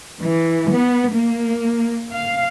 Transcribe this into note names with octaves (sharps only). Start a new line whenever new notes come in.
E3
B3
A#3
F5